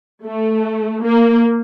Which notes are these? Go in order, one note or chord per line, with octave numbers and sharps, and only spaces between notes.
A3
A#3